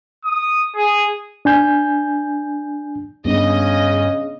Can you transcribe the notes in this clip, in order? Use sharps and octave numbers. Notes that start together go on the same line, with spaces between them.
D#6
G#4
D4 G#5 G6
G2 C#3 B3 D4 D#5